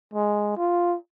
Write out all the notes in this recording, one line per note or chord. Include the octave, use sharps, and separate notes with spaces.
G#3
F4